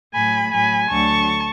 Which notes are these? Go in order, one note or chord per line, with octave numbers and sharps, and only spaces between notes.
A2 F#3 G#5 B5
A2 F#3 G#5 B5
D2 D3 F#3 A5 C#6